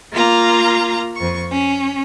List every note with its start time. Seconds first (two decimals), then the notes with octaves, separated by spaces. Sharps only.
0.13 A#3 F4 F5 A#5
1.16 F2 C#6
1.51 C#4